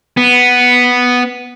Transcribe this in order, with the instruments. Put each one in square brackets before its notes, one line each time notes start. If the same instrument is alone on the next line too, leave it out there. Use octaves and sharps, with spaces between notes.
[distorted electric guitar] B3